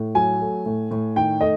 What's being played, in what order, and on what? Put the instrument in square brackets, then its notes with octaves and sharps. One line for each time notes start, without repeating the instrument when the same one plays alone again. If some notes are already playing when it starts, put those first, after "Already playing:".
Already playing: [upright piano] A2
F#3 G#5
A3
A2
A2
D#3 G5
A3 D#5